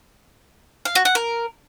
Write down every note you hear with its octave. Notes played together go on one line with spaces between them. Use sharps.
F5
F#4
F#5
A#4